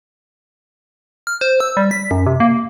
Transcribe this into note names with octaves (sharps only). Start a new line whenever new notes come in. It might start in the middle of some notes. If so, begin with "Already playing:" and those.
F6
C5
E6
G3
B6
F#2
C3
A#3